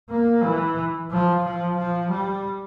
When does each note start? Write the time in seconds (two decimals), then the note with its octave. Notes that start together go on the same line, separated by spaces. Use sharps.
0.10 A#3
0.44 E3
1.11 F3
1.44 F3
1.78 F3
2.11 G3